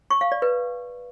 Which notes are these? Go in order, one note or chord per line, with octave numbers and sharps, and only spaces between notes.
C#6
F5
D5
B4